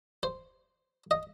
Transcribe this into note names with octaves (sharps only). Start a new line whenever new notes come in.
C5
D#5